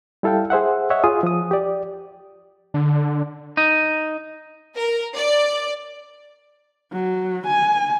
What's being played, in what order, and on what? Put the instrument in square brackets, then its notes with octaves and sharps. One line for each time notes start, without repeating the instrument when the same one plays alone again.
[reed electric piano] G3 E4 A4 F5 G5
G#4 C5 E5 F#5
C#5 D#5 E5 F#5
F4 G#4 G#5 D#6
F3 D#6
G4 D5
[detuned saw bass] D3
[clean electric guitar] D#4
[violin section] A#4
D5
[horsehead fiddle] F#3
G#5